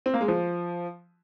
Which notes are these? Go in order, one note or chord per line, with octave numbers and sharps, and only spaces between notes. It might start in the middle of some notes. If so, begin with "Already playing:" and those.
C4
A#3
G#3
F3